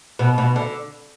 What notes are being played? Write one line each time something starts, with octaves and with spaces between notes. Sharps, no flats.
B2
B2
D3